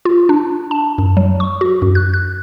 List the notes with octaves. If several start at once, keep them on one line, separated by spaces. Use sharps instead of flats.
F4
D4
A5
F#2
F#3
C#6
F#4
F#2
F#6
F#6